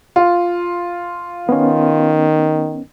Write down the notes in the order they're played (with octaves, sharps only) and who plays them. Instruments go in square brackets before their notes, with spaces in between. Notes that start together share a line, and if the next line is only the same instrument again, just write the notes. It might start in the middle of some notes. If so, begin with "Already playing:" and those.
[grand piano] F4
[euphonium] D#3 [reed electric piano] B3 C#4